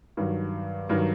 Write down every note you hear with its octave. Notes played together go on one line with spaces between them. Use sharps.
G2 D#3 F#3
G2 D#3 F#3 A#4